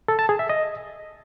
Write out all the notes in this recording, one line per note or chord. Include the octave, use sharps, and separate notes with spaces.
A4
A5
G#4
E5
D#5